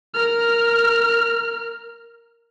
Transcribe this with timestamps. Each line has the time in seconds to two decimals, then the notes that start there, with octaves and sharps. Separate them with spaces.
0.14 A#4 F6